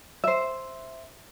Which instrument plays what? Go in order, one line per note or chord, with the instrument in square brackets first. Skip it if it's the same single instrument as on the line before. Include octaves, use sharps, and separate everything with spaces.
[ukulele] C5 E5